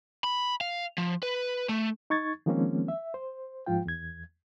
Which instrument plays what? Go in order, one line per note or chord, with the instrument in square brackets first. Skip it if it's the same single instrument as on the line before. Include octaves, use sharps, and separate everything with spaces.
[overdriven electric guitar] B5
F5
F3
B4
A3
[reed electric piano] D#4 C#6 G#6 A6
D#3 F3 G#3 A#3 C4 C#4
E5
C5
G#2 F3 F4 G5
E2 G#6